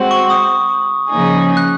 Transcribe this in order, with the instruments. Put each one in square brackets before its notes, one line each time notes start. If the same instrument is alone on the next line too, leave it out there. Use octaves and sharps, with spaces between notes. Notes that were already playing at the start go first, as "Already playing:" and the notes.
Already playing: [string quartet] G#3 C4 F#4 C5
[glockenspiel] C#6
D#6
[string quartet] C#3 F3 A#3 D#4 G#4
[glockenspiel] F#6